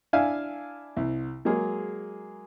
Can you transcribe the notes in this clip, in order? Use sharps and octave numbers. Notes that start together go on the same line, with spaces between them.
D4 E4 E5 F5 G#5
C2
F#3 G#3 A#3 G#4